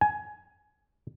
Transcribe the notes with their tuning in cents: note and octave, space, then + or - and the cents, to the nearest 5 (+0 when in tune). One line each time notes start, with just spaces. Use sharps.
G#5 +15